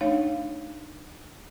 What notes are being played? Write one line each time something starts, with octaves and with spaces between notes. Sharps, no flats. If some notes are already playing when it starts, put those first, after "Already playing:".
A3 D4 D#4 C#5 F5